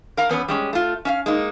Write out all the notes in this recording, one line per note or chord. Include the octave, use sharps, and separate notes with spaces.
A#4 F5 A#5
E2 B3 C#4 B4
G3 G#3 C#4
A3 F4
C#4 E5 F5
G#3 A#3 D#4